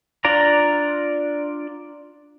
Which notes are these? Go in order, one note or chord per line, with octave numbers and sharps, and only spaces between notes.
D4 F4 D5 A#5